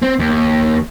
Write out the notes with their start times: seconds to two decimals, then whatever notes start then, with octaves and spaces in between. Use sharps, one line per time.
0.02 C4
0.19 D#2